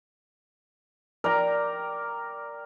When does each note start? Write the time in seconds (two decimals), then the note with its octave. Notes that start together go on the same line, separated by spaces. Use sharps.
1.24 A#4 D5 G5 A#5